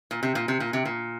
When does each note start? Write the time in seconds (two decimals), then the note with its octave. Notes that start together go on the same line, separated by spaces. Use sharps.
0.11 A#2
0.23 C3
0.35 A#2
0.48 C3
0.60 A#2
0.73 C3
0.85 A#2